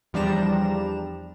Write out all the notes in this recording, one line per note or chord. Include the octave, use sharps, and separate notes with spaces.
E2 F3 G3 D4 A#5 E7